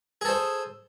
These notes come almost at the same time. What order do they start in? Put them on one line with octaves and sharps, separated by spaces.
G#4 A4 C5